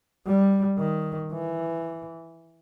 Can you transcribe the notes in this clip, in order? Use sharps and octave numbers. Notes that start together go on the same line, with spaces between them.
G3
D#3
E3